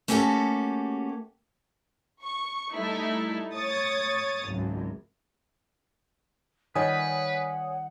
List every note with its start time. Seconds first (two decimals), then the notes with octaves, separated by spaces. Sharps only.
0.08 A3 A#3 C#4 F#4 G4 A4
2.22 C#6
2.73 G3 A3 D#4 E4 A4
3.54 C#5 C#6 D#6 A6
4.48 G#1 C#2 F#2
6.75 D#3 G3 B4 C#5 F#5 G#5 D#6